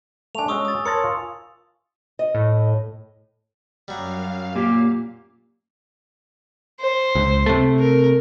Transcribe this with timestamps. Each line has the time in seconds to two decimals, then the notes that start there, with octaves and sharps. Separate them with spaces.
0.35 A3 D4 G#5 F7
0.48 G#3 C#4 F#4 C#6 D#6 E6
0.65 D#6 A6
0.86 A#4 C#5 A5 C6 D#6 C#7
1.04 F4
2.19 D#5
2.35 A2
3.88 F#2 F#3 G3 F5
4.56 A#2 G4
6.80 C5
7.15 C#2
7.46 C3 A3
7.79 A#4